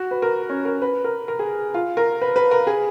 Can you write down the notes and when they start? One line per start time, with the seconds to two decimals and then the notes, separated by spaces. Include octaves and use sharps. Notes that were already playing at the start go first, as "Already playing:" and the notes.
Already playing: F#4
0.11 B4
0.22 A#4
0.50 C#4
0.65 A#4
0.82 B4
1.04 A#4
1.28 A#4
1.39 G#4
1.74 F4
1.97 A#4
2.21 B4
2.36 B4
2.51 A#4
2.67 G#4